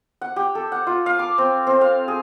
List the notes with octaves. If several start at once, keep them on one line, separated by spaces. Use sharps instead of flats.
F#5
G4
A4
F#5
F4
F5
D6
C4
C4
F5
G#4